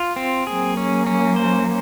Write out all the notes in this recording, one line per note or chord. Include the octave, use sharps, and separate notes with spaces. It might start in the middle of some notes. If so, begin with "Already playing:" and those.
Already playing: F4
C4
F#3 A#3 G#4
C#4
C#4
C5